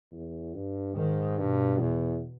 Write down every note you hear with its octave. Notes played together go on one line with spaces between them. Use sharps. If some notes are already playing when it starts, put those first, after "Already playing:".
E2
G2
G#2 D#3
G2 B2
E2